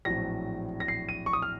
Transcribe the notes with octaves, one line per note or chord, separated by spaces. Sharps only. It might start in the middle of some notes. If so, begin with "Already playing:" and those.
A#1 A2 F#3 C4 A#6
A#6
C7
D#7
C#6
D#6
F6